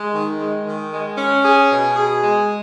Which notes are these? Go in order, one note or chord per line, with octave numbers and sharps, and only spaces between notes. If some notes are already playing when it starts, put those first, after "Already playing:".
Already playing: G#3
D#3
G#3
D#3
G#3
C#4
G#4
B2
G#4
G#3